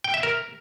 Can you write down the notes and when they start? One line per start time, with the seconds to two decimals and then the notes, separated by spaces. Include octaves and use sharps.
0.04 G5
0.14 E5
0.23 A#4